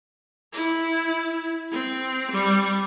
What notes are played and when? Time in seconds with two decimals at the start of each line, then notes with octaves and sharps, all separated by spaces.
0.53 E4
1.72 C4
2.31 G3